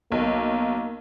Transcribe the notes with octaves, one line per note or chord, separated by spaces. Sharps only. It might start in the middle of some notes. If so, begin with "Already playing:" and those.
B1 A#3